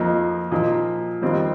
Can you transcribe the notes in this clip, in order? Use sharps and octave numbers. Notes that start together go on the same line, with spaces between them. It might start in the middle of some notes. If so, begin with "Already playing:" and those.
Already playing: F2 F3 A#3 D#4
A#2 F3 D#4
F2 D#3 G3 C4 D#4